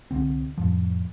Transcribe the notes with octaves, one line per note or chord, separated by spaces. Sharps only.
C2 D3 C4
F2 A2 F3